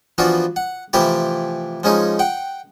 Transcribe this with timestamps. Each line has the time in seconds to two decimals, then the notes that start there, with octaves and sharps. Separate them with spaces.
0.18 E3 F3 B3 D4 F4 F#4
0.56 F#5
0.93 C3 E3 F3 A3 E4 G4
1.83 F3 G#3 C#4 D#4
2.19 F#5 G5